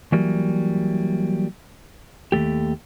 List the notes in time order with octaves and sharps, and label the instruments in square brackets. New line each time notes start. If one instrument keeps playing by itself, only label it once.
[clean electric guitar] E3 F#3 G3 A#3
D#2 G#2 A3 G4